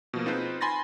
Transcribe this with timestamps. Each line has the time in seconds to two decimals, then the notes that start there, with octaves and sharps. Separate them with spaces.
0.13 B2 F3 A#3
0.26 C4 D#4 F4 G#4 B4 C5
0.61 G#5 B5 C6 A6 A#6